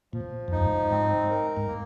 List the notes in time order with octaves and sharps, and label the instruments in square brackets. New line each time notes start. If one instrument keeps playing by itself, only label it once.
[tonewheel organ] A#2 [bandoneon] F3
[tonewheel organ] F2
[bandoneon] D#4
[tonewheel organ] F#2
G#2
[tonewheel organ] G#2 [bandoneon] C4
[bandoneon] A#4
[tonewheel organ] G#2
[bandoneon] A#3